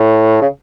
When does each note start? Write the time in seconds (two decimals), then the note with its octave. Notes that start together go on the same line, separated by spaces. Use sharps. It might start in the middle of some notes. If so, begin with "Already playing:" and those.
Already playing: A2
0.41 C#3